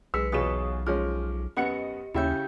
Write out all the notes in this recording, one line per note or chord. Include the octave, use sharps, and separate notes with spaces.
B1 G#3 B4 E6 B6 C#7
E2 B2 F4 G#4 C#5 C#6 D#6 E7
F3 G#3 C#4 D6 F6
F#2 B3 G4 D#5 F#5 C#7
D#2 C#3 C#4 E4 G4 E5 G5 G6